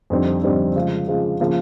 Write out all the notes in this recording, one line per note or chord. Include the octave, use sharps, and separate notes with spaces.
F2 D3 G3 C4 D#4
F2 D3 G3 C4 D#4
C#3 F3 G#3
C#3 F3 G#3
C#3 F3 A#3